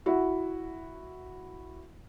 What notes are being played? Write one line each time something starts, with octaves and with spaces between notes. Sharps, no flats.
E4 F#4